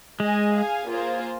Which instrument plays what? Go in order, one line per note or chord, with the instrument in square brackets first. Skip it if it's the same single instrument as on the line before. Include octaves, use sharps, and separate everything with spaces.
[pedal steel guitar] G#3 [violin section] G#4 D#5 G#5
[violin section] G#4 F5 G#5
A#3 F4 G#4 C5